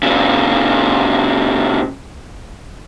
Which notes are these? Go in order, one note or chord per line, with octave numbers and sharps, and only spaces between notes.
A#2 C#3